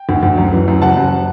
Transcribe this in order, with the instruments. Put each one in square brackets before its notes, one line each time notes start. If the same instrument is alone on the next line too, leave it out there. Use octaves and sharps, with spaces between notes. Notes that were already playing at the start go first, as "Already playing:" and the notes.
Already playing: [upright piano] G5
D2
D2
F#2
E3
F#2
F#1 F#5 A5
F#2